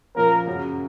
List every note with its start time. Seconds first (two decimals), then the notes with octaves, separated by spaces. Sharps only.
0.15 A#2 F3 A#3 C#4 A#4
0.47 F#2 C#3 F#3